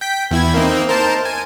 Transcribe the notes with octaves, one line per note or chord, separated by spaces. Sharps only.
G5 B6
E2 E4 G#6
A#3 C4 D#4
A#4 C5 A5
G#5